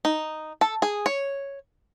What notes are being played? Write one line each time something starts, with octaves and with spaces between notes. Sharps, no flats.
D#4
A4
G#4
C#5